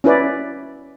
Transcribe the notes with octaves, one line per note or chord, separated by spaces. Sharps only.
C#4 E4 B4 D5